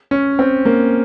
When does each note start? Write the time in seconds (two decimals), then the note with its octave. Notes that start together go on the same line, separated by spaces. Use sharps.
0.11 C#4
0.39 C4
0.65 A#3